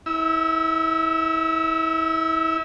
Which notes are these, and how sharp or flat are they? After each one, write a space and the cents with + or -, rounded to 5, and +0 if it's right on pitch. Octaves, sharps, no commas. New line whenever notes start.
E4 -35 E6 +0